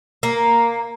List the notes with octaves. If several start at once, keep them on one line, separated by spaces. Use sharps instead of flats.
A#3